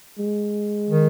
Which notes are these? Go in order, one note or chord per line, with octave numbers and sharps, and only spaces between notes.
G#3
D#3